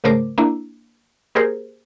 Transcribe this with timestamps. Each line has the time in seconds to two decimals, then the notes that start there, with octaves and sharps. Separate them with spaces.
0.04 G#2 C#3 A3 A#4 C5 D6
0.38 A#3 D4 E4
1.35 A#3 G4 G#4 A#4 C5